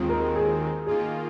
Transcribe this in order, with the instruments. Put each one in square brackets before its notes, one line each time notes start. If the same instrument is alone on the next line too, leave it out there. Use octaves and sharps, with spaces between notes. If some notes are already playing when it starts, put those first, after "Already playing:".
Already playing: [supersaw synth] D#2 D#3 G#3 C4 [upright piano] F4
[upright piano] A#4
G#4
[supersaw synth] D#3 A#3 F4 [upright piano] G#4